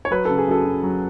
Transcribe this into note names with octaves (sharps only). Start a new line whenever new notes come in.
C#5
F#3 B4
C#3 A4
G#4
F#2 A4
F#2
F#3